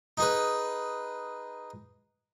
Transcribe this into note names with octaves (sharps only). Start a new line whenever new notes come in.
D#4 G#4 B4